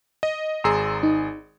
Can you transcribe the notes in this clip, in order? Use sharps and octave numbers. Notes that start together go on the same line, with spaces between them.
D#5
G#1 G#4 A#5 C6 E6
D#4